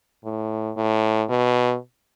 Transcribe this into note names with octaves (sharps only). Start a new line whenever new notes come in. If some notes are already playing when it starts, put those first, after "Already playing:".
A2
A2
B2